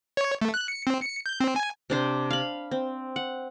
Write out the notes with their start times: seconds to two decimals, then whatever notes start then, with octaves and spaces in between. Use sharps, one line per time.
0.17 C#5
0.41 A3
0.54 F#6
0.68 C#7
0.87 C4
1.02 C#7
1.26 G6
1.40 C4
1.56 G#5
1.90 C3 D4 C5
2.30 F5 B5
2.71 C4
3.16 F#5